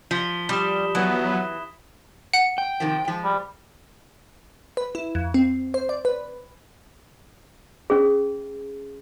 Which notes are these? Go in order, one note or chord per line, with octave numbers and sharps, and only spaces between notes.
F3 B6 G7
G3 B5 D#6 E7
E3 F#3 B3
F#5
G5
C3 D#3 F3
F3 G#3
G3
B4
E4
F2
C4
C5
D5
B4
C#4 G#4